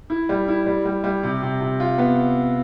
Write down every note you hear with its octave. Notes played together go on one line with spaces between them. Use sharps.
E4
G3
E4
G3
G3
G3
C3
C3
C3
F4
B3